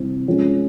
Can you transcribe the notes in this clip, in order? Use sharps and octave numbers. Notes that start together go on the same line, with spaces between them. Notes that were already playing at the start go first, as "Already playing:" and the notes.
Already playing: C3 G3 C4 E4
F3 G#3 C#4